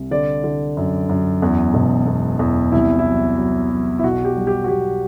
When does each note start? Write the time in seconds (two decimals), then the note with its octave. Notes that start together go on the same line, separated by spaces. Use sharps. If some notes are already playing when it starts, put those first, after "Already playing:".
Already playing: C2
0.11 D3 D5
0.44 D3
0.77 F#2
1.09 F#2
1.42 E2
1.74 E1
2.07 E2
2.39 E2
2.72 C2 E4
2.99 E4
3.06 F#3
3.38 F#3
3.70 F#3
3.99 E4
4.04 B1 F#4
4.25 G4
4.37 G3
4.47 G4
4.64 F#4
4.68 B1 G4